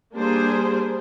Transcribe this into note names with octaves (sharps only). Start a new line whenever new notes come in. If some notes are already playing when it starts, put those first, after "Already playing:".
G3 A#3 D4 G#4 C5